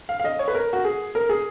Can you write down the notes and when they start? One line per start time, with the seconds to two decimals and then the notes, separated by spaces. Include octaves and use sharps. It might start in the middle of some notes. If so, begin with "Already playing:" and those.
0.09 F5
0.20 F5
0.24 D#5
0.39 C#5
0.48 B4
0.55 A#4
0.73 F#4
0.84 G#4
1.15 A#4
1.29 G#4